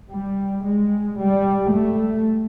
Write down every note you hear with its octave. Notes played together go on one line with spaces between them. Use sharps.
G3
G#3
G3
A3